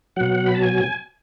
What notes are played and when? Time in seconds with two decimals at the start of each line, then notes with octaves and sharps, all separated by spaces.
0.16 B2 F#3 F#5
0.46 B5
0.55 A5
0.62 G#5